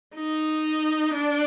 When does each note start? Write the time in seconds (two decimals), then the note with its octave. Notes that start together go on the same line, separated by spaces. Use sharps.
0.16 D#4
1.14 D4